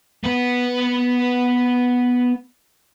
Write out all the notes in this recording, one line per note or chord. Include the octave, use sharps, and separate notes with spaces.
B3 B4